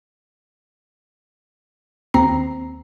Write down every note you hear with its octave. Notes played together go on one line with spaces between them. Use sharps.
D#2 C4 A#5 C7